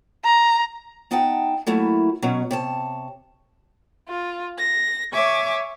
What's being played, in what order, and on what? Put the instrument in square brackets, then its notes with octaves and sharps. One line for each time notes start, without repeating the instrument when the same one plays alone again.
[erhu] A#5
[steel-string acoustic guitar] B3 D#4 F#5 G5 A5
F#3 A3 A#3 E4
B2 F#3 C#4
C3 C#5 A5
[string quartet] F4
A#6
C#5 E5 G#5 C#6 D6